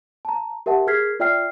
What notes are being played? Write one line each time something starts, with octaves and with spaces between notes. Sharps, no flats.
A5 A#5
G4 A#4 E5 F#5 A5
G#4 A#4 F6 G#6 B6 C7
F4 D5 E5 G5 F6 C7